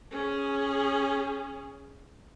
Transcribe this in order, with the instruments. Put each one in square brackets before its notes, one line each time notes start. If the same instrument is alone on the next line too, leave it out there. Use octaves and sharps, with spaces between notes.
[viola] C#4 G#4